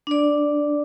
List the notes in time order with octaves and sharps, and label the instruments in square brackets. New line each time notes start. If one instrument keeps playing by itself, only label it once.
[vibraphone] D4 D5